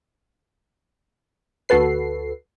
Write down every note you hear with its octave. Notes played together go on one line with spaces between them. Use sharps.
D2 F#4 A4 B4 C7